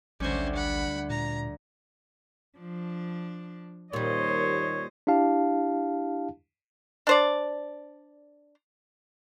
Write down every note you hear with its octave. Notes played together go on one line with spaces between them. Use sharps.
A1 D2 G3 C#4 C5
F#5 B5
A#2 A#5
F3 D4
D#2 A#2 G3 C5 C#5 D#5
D4 E4 G4 F5 A5
D4 C5 D5